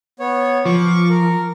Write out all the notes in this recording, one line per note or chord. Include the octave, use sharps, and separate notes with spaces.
B3 C#5
F3 C#6 D6
A#4